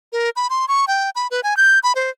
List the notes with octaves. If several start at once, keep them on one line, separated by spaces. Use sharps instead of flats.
A#4
B5
C6
C#6
G5
B5
B4
G#5
G6
B5
C5